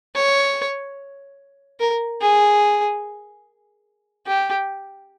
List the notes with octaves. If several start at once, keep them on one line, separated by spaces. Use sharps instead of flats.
C#5
A#4
G#4
G4